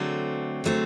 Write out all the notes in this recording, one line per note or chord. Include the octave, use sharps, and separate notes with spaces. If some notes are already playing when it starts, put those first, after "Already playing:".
Already playing: D3 F#3 A3 C4
D3 F#3 A3 C4